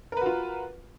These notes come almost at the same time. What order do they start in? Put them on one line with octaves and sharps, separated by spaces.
A#4 B4 F#4 F4